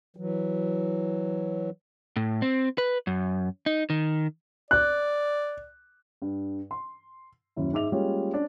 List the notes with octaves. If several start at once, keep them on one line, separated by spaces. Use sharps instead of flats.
E3 F#3
A2
C4
B4
F#2
D#4
D#3
D5 F#6
G2
C6
D#1 F#2 E4
G#2 E5 D6 F7
G3 G#3 A#3 C#4 F4 G4
C#4 D4 D5